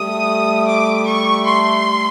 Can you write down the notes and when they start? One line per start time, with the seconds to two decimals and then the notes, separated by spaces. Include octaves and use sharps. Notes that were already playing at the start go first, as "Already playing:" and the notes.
Already playing: G3 A3 D#6
0.67 D6
1.06 C#6
1.45 C6